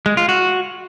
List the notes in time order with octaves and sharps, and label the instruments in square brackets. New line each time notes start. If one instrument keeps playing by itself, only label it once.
[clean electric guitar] G#3
F4
F#4